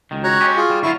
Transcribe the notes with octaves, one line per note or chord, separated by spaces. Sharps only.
C#2 D#3
F#4 C#5 A#5 F#6
G#3 C#4 G4
F4 G#4
G3
D3 F#3 E4 F4 C#6